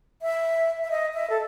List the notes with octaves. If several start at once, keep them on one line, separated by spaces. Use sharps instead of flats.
E5
E5
D#5
E5
A4